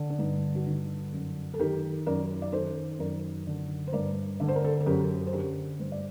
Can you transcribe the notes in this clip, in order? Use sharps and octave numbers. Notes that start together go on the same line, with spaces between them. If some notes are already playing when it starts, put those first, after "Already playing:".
Already playing: D3
D4
G2 D#4
F#4
D3 D#4
F#2
A4
D#3 G4 A#4
F#2 A#4 D5
D5
D#3 A4 C5
F#2 A#4 D5
D3
C5
G2 A#4 D5
D3 D5
C5
A#4
A4 C5
A4
F#2 G4 A#4
C5
D3 G4 A#4
G2 C5
D5